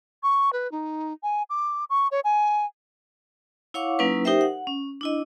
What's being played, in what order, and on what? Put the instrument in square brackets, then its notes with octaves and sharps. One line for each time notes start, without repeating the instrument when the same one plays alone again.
[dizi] C#6
B4
D#4
G#5
D6
C#6
C#5
G#5
[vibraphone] E4 C#5 F5 F#5 C#6 D6
F#3 A#3 C#4 D#4 E4 B4
D#4 G4 A#4 C5 E5 G5
F#5
C#4
D4 E4 D#5